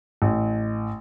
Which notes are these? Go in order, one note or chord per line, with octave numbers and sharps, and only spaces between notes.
A1